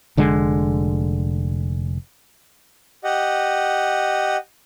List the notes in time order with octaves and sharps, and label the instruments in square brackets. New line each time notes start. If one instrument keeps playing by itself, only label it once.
[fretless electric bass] F1 D3 G#3
[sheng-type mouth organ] G4 D#5 F#5